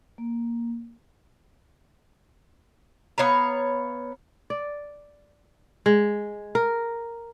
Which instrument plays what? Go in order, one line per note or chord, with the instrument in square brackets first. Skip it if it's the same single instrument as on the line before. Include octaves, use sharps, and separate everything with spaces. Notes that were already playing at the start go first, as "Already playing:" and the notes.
[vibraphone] A#3
[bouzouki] B3 C#5 F5 A#5
[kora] D5
G#3
A#4